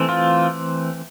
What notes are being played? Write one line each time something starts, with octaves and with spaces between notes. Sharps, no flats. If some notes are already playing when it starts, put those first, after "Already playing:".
Already playing: E3 A3 C4
F4